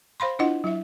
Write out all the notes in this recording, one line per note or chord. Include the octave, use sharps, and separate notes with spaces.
C5 F5 B5 C6
D4 E4 F4 D#5 F#5
F#3 E4 E5